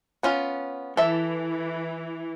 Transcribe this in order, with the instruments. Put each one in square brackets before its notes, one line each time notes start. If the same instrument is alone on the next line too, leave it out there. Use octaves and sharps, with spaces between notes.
[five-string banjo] B3 C#4 F4
[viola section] E3 [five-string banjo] A4 E5